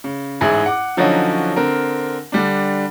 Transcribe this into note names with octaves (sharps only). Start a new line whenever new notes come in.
C#3
A1 G#2 E4 G#4
F#5 D6
D3 F3 F#3 C#4 D#4 F#4
D3 C4 A#4
D3 G3 D4